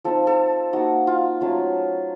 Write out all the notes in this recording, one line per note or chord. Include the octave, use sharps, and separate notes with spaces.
F3 C4 D#4 A4
A4
A#3 D#4 F#4
F4
F#3 A3 C#4 F4